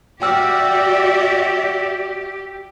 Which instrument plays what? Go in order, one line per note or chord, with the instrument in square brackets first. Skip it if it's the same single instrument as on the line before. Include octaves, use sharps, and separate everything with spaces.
[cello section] F#4 D5 E5 [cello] G4 [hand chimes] G5 E6 F6